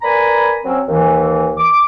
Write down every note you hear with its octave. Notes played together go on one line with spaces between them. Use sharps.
A#4 B4 D5 G#5 A#5 B5
F#3 C4 C#4
D#2 E3
D6